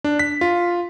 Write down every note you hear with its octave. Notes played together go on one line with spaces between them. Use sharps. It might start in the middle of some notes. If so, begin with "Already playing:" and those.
D4
B6
F4